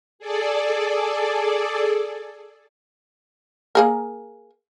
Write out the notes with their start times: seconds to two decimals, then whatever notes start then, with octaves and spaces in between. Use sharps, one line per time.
0.19 G#4 A4 D5
3.75 A#3 G#4 A#4